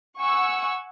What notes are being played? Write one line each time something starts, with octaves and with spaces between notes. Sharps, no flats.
F#5 G#5 C#6 E6 C#7